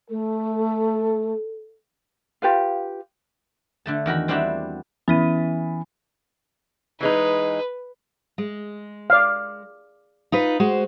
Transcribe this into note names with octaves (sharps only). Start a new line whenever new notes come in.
A3 A4
F4 G4 B4 F5
D3 A3 A5
E2 D#3 F#4 B5
G3 C4 D4 E4 F#4 G4
E3 B3 C#4 D#7
E3 G#3 D#4 B4
G#3
D5 F5
D#4 F4 B4
G#3 F#4 C5